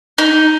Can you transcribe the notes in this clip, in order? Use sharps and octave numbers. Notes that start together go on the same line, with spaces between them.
D#4